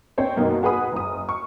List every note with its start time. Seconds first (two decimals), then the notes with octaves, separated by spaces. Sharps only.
0.18 C4 C5 C#5 G5
0.36 F#2 B2 A#3 D#4
0.63 F#4 G#4 B4 B5 D#6
0.92 F#1 D#6
1.29 C#6